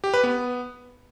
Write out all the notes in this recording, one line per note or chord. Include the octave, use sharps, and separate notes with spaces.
G4
B4
B3